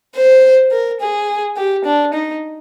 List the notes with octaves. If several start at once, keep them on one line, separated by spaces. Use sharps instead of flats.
C5
A#4
G#4
G4
D4
D#4